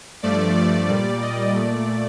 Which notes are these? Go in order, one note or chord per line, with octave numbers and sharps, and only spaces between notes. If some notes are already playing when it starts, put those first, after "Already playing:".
G2 F3 A3 D5
D5
A#2 G3
D#5
A#2 A3 D5